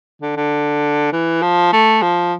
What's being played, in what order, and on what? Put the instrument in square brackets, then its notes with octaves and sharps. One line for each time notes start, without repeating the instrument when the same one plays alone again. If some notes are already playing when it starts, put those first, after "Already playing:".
[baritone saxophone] D3
D3
E3
F3
A3
F3